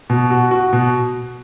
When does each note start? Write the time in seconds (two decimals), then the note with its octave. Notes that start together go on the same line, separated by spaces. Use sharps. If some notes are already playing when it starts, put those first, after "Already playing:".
0.10 B2
0.31 F#4
0.51 F#4
0.73 B2